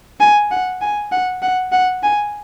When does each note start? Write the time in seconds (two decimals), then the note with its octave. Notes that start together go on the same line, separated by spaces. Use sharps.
0.20 G#5
0.51 F#5
0.81 G#5
1.12 F#5
1.42 F#5
1.72 F#5
2.04 G#5